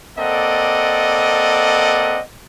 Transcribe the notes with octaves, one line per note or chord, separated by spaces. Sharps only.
A#3 C4 A4 D5 D#5 F#5